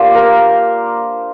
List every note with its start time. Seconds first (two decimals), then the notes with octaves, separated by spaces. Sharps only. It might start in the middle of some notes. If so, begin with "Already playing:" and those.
Already playing: A#3 D4 F4 G4 C5
0.15 A#4